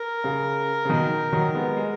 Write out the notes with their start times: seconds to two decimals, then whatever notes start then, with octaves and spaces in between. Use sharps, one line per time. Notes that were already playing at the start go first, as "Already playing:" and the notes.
Already playing: A#4
0.24 C#3
0.85 C#3
0.89 B2 D#3
1.32 D#3 F#3
1.55 G#3 B3
1.77 G#3